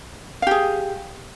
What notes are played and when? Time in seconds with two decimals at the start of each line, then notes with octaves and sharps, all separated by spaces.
0.42 F5
0.47 G4
0.51 G#4